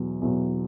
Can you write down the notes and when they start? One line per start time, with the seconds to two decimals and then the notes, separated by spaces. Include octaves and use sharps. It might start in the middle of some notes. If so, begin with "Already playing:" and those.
Already playing: E2 B2 F#3
0.21 E2 B2 F#3